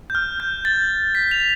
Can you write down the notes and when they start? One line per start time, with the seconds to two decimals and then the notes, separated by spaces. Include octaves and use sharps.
0.10 G6
0.15 F6
0.40 G6
0.65 A6
1.15 B6
1.31 F7